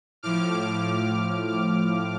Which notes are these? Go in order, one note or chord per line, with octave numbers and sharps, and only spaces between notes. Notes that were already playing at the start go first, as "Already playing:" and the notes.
A2 F3 D6 F6
D6 F6